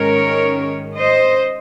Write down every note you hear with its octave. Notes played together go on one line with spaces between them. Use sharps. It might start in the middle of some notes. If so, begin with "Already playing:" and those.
Already playing: G#2 D#3 G#3 C#4 A#4 C#5
C5 D#5